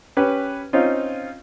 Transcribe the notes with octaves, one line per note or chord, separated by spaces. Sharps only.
C#4 G4 B4
C4 C#4 D#4 F4